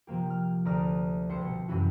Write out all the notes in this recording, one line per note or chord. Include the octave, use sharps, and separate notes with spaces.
C3 F3 A#3 G4
F6
D2 D5 A#5 D#6 F6
C2 C5 C#7
B2
F#2 C3 E3 C#4 E4 F#4